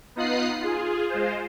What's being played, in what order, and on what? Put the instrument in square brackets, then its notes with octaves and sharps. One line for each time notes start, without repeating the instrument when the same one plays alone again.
[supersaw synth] B3 D#4 F4 D#6 F#6 C7
F4 G#4
G#3 F4 C5